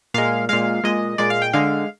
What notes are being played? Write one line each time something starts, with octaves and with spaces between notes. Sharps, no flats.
A#2 G#3 F5
A#2 G#3 F5
A#2 G#3 D#5
A#2 G#3 D5
F5
G5
D3 G#3 F5